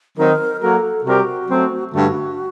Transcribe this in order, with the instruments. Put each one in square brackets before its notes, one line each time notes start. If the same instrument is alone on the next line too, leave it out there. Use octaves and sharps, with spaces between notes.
[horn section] D#3 F#3 C4 D#4 [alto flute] A#4
[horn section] F#3 A#3 F#4 A#4 [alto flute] A4
[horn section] C3 G3 C4 G4 A#4 [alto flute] F#4
[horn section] F#3 A3 C4
[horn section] G2 D3 A3 [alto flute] F#4